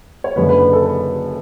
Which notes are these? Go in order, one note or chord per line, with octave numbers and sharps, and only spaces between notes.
C#5
F#1 F#2 D3 B4
B4
B4
A4
B4